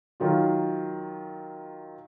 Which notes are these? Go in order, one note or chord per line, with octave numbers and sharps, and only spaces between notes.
D#3 F#3 F4